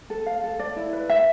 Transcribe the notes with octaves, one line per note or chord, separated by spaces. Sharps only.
A4
F5
A4
D5
E4
B4
E5